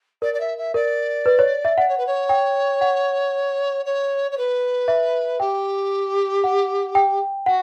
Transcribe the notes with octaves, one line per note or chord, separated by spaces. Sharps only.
A#4 D5
D5
E5
E5
A#4 D5
B4
C#5
E5
D5 F#5
C#5
B4
C#5
G5
F#5
C#5
C#5
B4
E5
G4 G5
F#5
G5
F#4 F#5